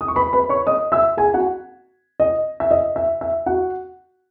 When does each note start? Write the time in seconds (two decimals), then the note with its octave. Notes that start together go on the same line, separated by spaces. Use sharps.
0.01 D#6
0.08 C#6
0.16 B4 B5
0.33 B4 B5
0.49 C#5 C#6
0.67 D#5 D#6
0.92 E5 E6
1.17 G#4 G#5
1.34 F#4 F#5
2.20 D#5
2.60 E5
2.71 D#5
2.96 E5
3.21 E5
3.46 F#4 F#5